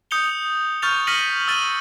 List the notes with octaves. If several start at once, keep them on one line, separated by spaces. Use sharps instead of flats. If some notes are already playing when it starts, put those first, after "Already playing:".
D#6 G6 C#7 F7 G7
C#6 F6 G6 A6 F7
F6 A#6 B6 C#7 D#7 F#7
E6 F6 A6 D#7